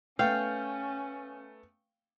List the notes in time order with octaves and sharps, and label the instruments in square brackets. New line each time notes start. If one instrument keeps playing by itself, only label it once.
[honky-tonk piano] A3 B3 [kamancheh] C#4 [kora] F5 [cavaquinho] G5